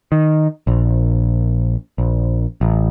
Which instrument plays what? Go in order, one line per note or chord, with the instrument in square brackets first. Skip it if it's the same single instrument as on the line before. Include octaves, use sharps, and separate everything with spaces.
[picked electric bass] D#3
A#1
A#1
A1